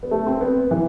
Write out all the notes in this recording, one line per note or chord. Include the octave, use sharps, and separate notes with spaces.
B3
A3
C4
B3
E3